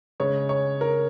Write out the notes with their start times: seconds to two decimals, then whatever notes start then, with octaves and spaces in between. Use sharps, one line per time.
0.20 C#3 G#3 C#5
0.49 C#5
0.81 A#4